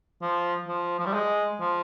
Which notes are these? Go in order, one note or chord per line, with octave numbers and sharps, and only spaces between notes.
F3
F3
F3
G3
G#3
F3